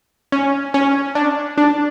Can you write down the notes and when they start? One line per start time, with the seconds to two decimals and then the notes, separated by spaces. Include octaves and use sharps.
0.32 C#4
0.74 C#4
1.15 D4
1.58 D4